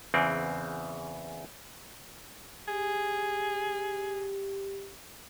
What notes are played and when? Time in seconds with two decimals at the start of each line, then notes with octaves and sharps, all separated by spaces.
0.14 E2 C#3 E3 C4
2.68 G4 G#4